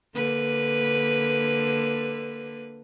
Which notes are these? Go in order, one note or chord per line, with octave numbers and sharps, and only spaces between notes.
D3 A#3 B4